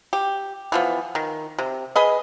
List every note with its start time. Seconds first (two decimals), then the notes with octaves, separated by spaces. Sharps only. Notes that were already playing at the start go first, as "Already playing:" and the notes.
0.13 G4
0.72 E3 F3 B3
1.15 D#3
1.58 C3
1.96 G#4 B4 D#5